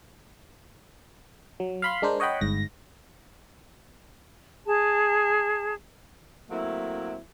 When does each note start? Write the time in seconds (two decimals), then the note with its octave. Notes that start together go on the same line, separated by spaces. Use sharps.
1.60 F#3
1.82 F5 B5 C6
2.02 G#3 D4 A#4 C5
2.20 C#5 D#5 F#5 G5 B5
2.41 G1 G#2 A#6
4.66 G#4 A5
6.51 F#3 A3 A#3 C4 E4